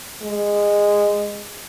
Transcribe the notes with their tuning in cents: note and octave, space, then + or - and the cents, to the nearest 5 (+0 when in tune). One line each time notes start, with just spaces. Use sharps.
G#3 -15